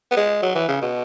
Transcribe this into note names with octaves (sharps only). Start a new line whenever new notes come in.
B3
G#3
F#3
E3
C#3
B2